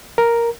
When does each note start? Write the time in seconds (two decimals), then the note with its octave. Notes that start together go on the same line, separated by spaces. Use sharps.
0.18 A#4